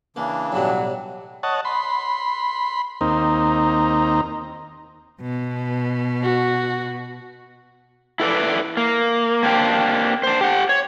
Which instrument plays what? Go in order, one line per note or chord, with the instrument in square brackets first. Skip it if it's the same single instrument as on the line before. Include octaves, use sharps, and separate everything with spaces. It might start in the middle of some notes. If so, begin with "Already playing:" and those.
[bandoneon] C#3 E3 D4 [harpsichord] A#3
[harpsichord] B1 A2 G3 [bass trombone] F#3
[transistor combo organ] C#5 D#5 F#5 A5
B5 C6
D#2 A#3 C4 D#4
[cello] B2
[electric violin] F#4
[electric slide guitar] E4 A4 B4 D5
A#3
A#3 C4 D4 F#4 G4
D4 C5
G4 F#5
C#5